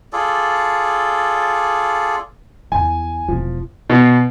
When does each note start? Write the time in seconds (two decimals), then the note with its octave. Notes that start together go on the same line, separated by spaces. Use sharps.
0.13 F4 G#4 A4 D5
2.72 E2 G#5
3.28 E1 E3 F3
3.90 B2